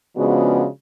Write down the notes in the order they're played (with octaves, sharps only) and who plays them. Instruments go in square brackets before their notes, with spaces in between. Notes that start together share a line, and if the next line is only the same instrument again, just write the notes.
[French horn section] C#3 F3 G#3 B3 D4 F#4